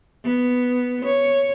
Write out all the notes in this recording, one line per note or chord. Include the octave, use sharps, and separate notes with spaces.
B3
C#5